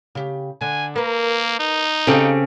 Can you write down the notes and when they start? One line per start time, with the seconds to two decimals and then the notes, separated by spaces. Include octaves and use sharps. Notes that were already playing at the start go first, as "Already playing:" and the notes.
0.15 C#3 G4
0.61 D3 G#5
0.96 A#3 A#4 B4
1.59 D#4
2.07 C#3 C4 G4 A4 F5